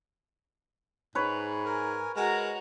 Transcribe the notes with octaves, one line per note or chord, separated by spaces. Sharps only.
G#2 B4 C#5
A#4 G#5
G#3 F#4 A#4 A#5